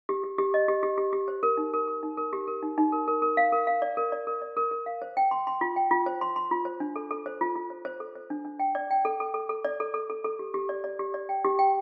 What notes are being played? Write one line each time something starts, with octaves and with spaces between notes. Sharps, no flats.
G4
G4
G4
D#5
G4
G4
G4
G4
C5
A#4
D#4
A#4
A#4
D#4
A#4
G4
A#4
D#4
D#4
A#4
A#4
A#4
F5
A#4
F5
D5
A#4
D5
A#4
D5
A#4
A#4
F5
C5
G5
C6
C6
F4
G5
F4
C5
C6
C6
F4
C5
D4
A4
A4
C5
F4
F4
C5
C5
A4
C5
D4
D4
G5
D5
G5
A4
A4
A4
A4
D5
A4
A4
A4
A4
G4
G4
D5
D5
G4
D5
G5
G4
G5